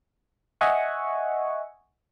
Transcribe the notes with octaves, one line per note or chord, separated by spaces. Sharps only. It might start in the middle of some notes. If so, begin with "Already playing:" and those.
D#5 E5 F#5 G#5 C#6